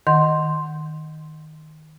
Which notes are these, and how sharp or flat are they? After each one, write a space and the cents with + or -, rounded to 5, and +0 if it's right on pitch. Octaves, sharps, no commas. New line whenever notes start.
D#3 +0 F#5 +0 C6 +0